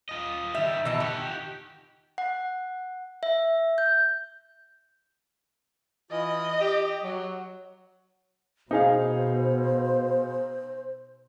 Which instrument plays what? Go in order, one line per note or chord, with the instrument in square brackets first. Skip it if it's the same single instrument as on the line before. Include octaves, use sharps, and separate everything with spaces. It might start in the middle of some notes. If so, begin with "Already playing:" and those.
[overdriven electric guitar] F4 D#5
[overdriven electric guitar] D#3 G3 [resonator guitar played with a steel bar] E5
[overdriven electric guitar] B2 [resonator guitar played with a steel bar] E3 D#5 A5
[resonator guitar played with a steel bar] D#3 [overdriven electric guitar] G4 F#5
[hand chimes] F#5
E5
G6
[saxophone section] E3 F4 [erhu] D#5
[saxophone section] G4
F#3
[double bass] B2 [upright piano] D#4 G#4 F5 [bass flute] C5